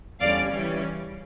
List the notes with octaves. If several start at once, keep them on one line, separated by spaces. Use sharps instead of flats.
E2 D3 G3 C#4 D5 F5
C#3 E3 G3 C#4